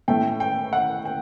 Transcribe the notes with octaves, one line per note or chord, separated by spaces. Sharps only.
A2 A3 G5
G5
F#5
G5